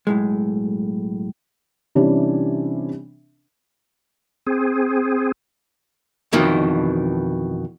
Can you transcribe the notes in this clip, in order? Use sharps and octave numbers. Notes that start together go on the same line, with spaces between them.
B1 A2 G#3
C3 E3 G3 C#4 D4
C4 G#4
F2 B2 D#3 E3